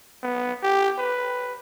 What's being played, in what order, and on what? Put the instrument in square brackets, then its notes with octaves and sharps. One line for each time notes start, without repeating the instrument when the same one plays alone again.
[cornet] B3
G4
B4